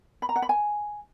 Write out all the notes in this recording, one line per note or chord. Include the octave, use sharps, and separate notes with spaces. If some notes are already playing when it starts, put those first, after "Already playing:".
B5
A#5
F#5
B5
G#5